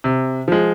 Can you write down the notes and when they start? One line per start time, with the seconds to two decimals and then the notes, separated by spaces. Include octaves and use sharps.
0.04 C3
0.48 F3 G#3